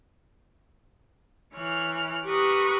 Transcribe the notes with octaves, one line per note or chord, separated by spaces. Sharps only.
E3 C#5 F6 F#6
G4 A#4 B4 C#6 D#6 F#6